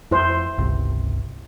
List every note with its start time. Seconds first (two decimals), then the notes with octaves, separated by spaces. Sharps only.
0.11 F2 E4 C5
0.57 G1 C#2 C3